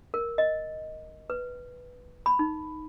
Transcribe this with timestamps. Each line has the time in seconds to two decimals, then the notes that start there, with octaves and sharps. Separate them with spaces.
0.14 A#4
0.38 D#5
1.30 B4
2.26 B5
2.39 D#4